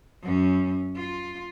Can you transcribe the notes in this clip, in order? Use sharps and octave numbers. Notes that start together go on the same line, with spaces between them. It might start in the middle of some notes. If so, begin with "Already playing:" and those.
F#2 C#4
F4